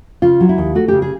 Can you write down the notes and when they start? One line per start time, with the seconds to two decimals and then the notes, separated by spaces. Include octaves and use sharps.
0.22 C#3 F4
0.40 F#3
0.49 E4
0.58 D#2
0.75 A3 F#4
0.88 C#3 G4
1.02 G#4